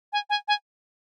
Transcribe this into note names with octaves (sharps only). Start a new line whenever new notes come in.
G#5
G#5
G#5